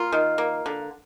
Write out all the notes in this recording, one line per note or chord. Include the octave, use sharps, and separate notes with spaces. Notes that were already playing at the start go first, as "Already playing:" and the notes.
Already playing: A#3 F4
D#3
A#3
D3